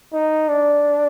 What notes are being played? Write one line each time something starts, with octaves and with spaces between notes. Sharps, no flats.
D#4
D4